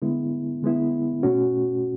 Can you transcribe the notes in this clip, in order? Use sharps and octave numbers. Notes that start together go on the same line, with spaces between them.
D3 G#3 B3 E4
D3 G#3 B3 E4
B2 A3 C#4 F#4